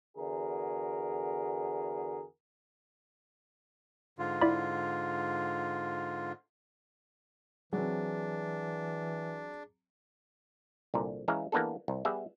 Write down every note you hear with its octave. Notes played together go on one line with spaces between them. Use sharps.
E2 D3 F#4 G#4 A#4
G#2 D3 F4
E4 D5 B5
E3 F#3 C4 D4 G#4
C2 A#2 D3
E3 G#3 C#4 E5 F5 A#5
E3 A#3 B3 D4 G#4 A4
C2
G3 B3 G#4 E5